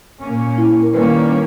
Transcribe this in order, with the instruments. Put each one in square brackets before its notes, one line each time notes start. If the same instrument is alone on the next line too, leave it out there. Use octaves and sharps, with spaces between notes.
[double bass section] A#2 A#3 C#4
[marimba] E4
A#4
[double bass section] D#3 G3 A#3 C#4 [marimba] B4